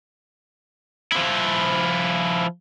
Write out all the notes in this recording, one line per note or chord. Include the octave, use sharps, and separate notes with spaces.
F3 E4